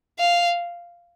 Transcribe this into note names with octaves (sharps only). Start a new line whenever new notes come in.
F5